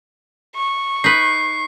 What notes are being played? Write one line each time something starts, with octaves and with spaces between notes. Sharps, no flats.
C#6
D#4 B4 C7